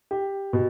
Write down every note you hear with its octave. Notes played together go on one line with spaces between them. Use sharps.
G4
B2